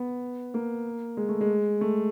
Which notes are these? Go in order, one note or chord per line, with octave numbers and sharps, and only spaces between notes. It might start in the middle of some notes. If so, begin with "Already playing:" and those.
Already playing: B3
A#3
G#3
A3
G#3
A3